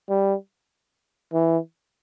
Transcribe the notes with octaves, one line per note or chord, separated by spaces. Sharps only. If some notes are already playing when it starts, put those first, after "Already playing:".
G3
E3